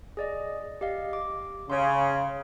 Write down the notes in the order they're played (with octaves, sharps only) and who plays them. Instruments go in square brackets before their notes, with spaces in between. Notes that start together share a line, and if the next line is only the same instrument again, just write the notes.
[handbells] G#4 D5 D#5
G4 D#5 F5
D6
[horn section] C#3 [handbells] C#5 F5 C6